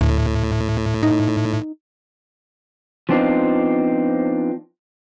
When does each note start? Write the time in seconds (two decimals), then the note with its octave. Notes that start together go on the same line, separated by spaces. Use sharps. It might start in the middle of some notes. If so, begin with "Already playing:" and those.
0.01 D2 A2
1.03 D#4
3.09 F3 B3 C4 D4 D#4 F4